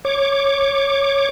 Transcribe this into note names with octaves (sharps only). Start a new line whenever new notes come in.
C#5 D6